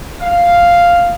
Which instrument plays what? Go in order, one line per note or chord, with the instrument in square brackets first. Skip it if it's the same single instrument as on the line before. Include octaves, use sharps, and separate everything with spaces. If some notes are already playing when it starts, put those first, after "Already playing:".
[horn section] F5